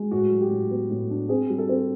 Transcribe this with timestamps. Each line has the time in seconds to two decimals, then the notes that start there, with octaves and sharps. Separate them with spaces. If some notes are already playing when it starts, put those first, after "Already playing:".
Already playing: G#3
0.11 A2 F#4
0.31 F#3
0.41 G4
0.51 A2
0.71 B3
0.91 A2
1.10 D4
1.29 C4 G#4
1.50 G3
1.58 A4
1.69 C4